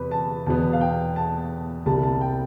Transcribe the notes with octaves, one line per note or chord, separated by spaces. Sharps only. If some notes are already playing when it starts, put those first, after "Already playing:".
Already playing: E2 C3 B4
A5
E2 B2 B3 A5
F5
G5
A5
C2 C3 G3 A5
A5
G5